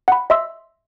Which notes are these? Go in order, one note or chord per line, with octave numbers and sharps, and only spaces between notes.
F#5 B5
D#5 E5 C6 E6